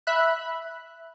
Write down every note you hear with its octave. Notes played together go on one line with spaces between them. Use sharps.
E5 B5 F#6